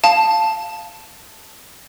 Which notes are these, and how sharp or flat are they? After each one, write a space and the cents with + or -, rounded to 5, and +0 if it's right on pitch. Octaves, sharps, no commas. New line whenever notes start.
F5 +0 A5 +0